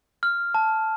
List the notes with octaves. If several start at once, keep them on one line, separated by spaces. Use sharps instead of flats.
F6
A5